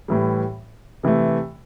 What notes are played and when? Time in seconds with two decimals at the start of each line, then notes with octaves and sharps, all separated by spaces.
0.08 A2 E3 G3
1.03 C3 E3 A3